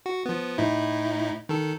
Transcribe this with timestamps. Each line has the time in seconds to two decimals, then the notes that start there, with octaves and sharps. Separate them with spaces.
0.06 F#4
0.26 F3 B3
0.58 A2 D#4 E4
1.49 D#3 A4